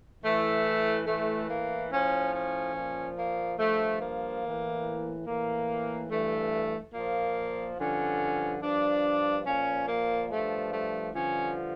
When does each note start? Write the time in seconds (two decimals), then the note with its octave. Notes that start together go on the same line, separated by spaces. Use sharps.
0.23 A2 E3 A3
1.07 A2 E3 A3
1.48 A#3
1.91 A2 F3 C#4
2.33 C#4
2.74 A#2 F3
3.17 A#3
3.58 G2 F3 A3
4.00 A#3
4.42 A2 E3
5.26 A2 E3 A#3
6.10 G2 E3 A3
6.94 A#2 F3 A#3
7.78 G2 D3 F3 C#4
8.61 G2 F3 D4
9.45 A#2 F3 C#4
9.87 A#3
10.30 G2 F3 A3
10.72 A3
11.14 G2 D3 F3 C#4